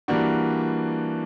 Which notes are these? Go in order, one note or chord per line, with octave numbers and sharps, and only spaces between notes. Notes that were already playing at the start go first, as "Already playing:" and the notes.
E3 G3 A#3 D4 F#4